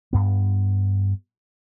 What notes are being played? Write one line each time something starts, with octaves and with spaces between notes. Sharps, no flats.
G2 B3